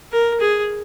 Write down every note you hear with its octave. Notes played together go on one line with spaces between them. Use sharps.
A#4
G#4